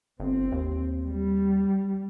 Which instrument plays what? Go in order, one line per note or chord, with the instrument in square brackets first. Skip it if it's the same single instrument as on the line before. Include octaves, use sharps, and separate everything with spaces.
[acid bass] G1 [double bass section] C4
[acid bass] D#2
[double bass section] G3